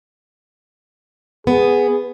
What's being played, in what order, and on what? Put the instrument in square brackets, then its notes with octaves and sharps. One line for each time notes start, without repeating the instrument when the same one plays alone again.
[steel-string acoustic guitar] B3 [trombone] G#4